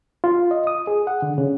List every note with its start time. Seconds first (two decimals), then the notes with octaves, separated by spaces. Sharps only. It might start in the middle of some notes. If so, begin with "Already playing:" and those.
0.24 F4
0.51 D#5
0.67 D#6
0.87 G#4
1.07 F#5
1.22 D3
1.38 C#3